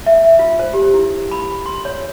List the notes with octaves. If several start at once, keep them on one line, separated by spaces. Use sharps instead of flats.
E5
F4
C5
G4
E4
B5
C6
C#5